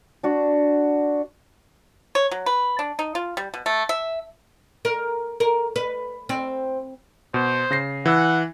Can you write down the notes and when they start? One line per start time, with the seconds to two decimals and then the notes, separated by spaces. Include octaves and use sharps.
0.23 D4 F#4
2.15 C#5
2.31 F#3
2.46 B4
2.79 D4
2.99 D#4
3.15 F4
3.37 G3
3.54 B2
3.66 A3
3.89 E5
4.85 A#4
5.40 A#4
5.76 B4
6.29 C4
7.34 B2 C5
7.71 C#3 A#6 C7
8.06 E3 F#5 E6